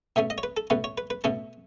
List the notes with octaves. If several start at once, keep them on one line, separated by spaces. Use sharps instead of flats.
B2 A3 C#4 E5
D#5
C#5
B4
A4
B2 A3 C#4 B4
C#5
B4
B4
B2 A3 C#4 A4